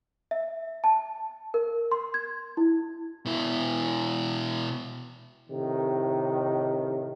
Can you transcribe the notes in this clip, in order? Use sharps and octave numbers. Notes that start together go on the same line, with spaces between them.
E5
A5
A#4
C6
G#6
E4
B2 E4
A2 C3 D#3